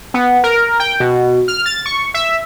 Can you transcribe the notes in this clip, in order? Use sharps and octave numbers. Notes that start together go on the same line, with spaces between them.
B3
A#4
G5
B2
F6
A6
C#6
E5